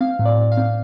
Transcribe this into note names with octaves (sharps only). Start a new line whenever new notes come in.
C4 F5
A2
D5
A2
F5
C4